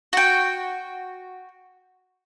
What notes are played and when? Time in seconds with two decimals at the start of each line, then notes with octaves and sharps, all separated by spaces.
0.13 F#4 G5